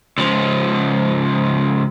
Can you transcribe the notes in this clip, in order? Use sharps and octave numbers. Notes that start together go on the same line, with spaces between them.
C#2 F3